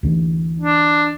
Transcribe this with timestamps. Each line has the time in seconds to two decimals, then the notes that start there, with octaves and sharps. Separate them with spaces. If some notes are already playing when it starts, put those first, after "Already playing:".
0.03 D2 D3 E3
0.60 D4